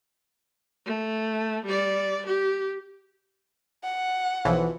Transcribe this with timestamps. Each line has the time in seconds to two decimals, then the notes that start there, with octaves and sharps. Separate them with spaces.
0.86 A3
1.65 G3 D5
2.27 G4
3.84 F#5
4.45 B1 E3 F3